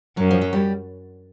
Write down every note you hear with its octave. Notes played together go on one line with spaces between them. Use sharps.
F#2 F#3
F3
F#3
G3